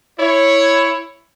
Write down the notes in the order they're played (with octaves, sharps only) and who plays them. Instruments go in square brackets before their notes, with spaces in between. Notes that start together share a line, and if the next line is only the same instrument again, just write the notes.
[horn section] E4 C#5